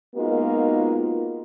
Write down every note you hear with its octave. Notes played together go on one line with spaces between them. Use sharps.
G#3 A#3 B3 D#4 F4 F#4